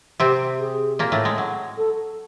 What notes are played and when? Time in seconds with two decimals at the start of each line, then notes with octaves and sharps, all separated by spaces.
0.20 C3 C4 G4
0.60 G#4
0.99 A#2 A#3
1.12 A2 A3
1.25 G#3
1.38 F#3
1.77 A4